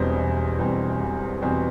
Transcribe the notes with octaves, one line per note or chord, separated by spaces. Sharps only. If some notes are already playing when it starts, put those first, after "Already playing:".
Already playing: E1 E2 B2 G3 C4 C5
E1
E2 B2 G3 C4
E1
E2 B2 G3 C4